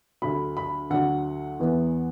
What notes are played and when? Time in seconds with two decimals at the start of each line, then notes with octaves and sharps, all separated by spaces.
0.22 D2 D3 F#3 B5
0.57 B5
0.90 D2 D3 F#3 F#5
1.60 E2 E3 B3